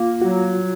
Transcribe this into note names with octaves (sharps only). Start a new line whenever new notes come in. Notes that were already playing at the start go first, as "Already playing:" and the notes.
Already playing: A#3 F4
F#3 F#4